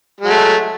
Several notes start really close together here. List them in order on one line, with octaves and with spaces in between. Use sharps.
G#3 F#3 A3